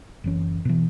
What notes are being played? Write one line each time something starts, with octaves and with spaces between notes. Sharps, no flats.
F#1 E3 C#4
B2 E3